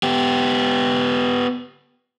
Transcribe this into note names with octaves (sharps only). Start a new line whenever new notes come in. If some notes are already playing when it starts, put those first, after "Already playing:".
B3 G4